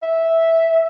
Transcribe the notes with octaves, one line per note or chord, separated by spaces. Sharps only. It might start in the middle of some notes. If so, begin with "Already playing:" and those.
E5